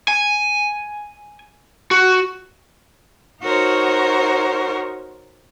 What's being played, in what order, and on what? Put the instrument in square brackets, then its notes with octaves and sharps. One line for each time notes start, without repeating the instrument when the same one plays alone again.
[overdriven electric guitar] G#5
F#4
[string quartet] D#4 F#4 A#4 C5 C#5